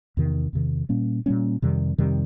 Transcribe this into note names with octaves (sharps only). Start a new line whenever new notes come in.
E2 C3 D#3
E2 C3 D#3
A#2 G3 A#3 C#4
A#2 G3 A#3 C#4
F2 C3 D#3 G3
F2 C3 D#3 G3